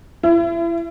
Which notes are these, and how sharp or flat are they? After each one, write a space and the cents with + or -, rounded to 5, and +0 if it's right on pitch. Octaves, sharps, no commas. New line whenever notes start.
E4 +35